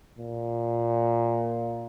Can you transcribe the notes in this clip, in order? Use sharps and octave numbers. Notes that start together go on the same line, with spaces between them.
A#2